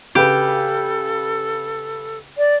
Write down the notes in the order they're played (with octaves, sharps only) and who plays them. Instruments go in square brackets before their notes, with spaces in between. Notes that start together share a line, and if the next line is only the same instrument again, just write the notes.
[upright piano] C#3 B4 [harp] G4 [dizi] A4
[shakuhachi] D5